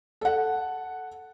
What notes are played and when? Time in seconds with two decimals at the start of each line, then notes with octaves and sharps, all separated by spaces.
0.21 A4 F#5